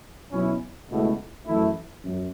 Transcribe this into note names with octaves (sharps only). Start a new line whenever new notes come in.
B2 F#3 C#4 E4
C#2 B2 A3 E4
F#2 E3 A3 E4
F#2